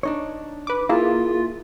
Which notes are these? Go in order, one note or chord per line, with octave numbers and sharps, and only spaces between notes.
D4 D#4 C#5
B4 D6
A#3 E4 F4 G#4